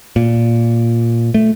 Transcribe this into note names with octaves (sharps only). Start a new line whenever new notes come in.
A#2
A3